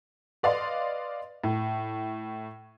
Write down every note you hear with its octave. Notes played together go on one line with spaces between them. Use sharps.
B4 D5 D#5 F5 C6
A2